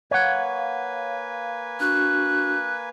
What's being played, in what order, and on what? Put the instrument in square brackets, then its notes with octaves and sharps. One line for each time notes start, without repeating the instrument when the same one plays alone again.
[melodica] A#3 B4 G#5 [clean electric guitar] C#5 F#5 [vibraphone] F5
[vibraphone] D4 F#4 C#6 [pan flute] F#6